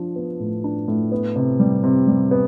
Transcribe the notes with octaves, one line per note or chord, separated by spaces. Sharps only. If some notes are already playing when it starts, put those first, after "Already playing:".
Already playing: F3 D4
B3
A2
D4
A2
B3
C3
G3
C3
G3
B3